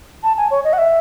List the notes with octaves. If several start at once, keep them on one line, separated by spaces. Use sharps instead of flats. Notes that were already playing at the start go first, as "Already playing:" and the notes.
A5
G#5
C#5
D#5
F#5
E5